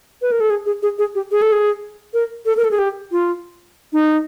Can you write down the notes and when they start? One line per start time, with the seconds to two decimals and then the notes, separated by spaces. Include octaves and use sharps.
0.22 B4
0.32 A#4
0.40 A4
0.50 G#4
0.66 G#4
0.83 G#4
0.98 G#4
1.15 G4
1.32 G#4
1.42 A4
1.52 G#4
2.14 A#4
2.46 A4
2.57 A#4
2.64 A4
2.71 G#4
2.79 G4
3.12 F4
3.93 D#4